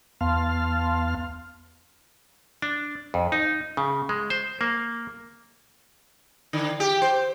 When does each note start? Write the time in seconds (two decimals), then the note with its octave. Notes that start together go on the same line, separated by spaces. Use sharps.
0.21 E2 B3 F5 A5 C6 F6
2.62 D4
3.14 F2
3.32 D#4
3.77 C#3
4.09 G#3
4.30 C5
4.61 A#3
6.53 D3
6.80 G4
7.02 C5